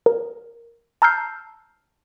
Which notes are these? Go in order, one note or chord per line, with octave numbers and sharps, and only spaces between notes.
A#4
A5 A#5 E6 F6 G6 C7